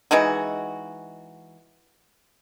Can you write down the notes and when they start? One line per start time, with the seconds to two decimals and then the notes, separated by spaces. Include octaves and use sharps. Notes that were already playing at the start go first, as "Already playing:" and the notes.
0.11 E3 G#3 D#4 F#4